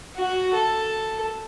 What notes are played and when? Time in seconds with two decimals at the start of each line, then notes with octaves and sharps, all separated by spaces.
0.16 F#4
0.54 A4